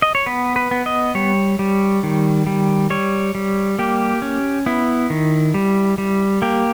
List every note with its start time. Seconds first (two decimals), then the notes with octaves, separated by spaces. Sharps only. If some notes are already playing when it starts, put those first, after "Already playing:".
0.02 D#5
0.15 C#5
0.26 B3 B4
0.56 B4
0.71 B3
0.86 D#5
1.15 G3 C#5
1.59 G3
2.03 D#3
2.47 G3
2.90 G3 C#5
3.35 G3
3.79 A#3 G4
4.22 C#4
4.66 B3 E4
5.10 D#3
5.54 G3
5.98 G3
6.42 A#3 G4